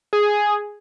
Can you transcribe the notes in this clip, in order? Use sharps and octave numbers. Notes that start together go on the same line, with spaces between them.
G#4